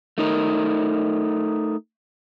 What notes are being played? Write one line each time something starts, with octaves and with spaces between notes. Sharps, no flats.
A3 D#4 A#4